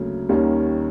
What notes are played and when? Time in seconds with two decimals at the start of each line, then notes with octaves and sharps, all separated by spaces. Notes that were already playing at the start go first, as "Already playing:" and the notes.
Already playing: D2 C#3 F#3 A#3 C#4
0.29 D#2 D#3 G3 A#3 C#4